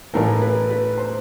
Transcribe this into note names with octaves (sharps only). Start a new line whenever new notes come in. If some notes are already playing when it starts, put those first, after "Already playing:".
A1 A2 E3 A#4
B4
B4
C5